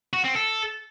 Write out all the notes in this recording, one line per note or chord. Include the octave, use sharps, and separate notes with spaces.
F#4
C4
A4